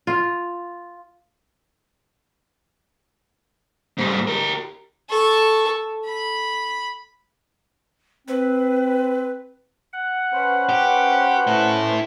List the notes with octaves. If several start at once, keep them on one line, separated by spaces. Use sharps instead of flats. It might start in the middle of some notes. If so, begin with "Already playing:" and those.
F4
G#2 G3
G4 A#4
A4 C#6
B5
C4 B4
F#5
C#4 B4 C5
G4
E4 A4